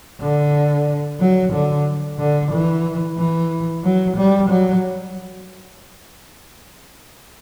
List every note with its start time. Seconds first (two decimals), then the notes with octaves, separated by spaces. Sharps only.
0.21 D3
1.20 F#3
1.53 D3
2.19 D3
2.51 E3
3.18 E3
3.83 F#3
4.17 G3
4.50 F#3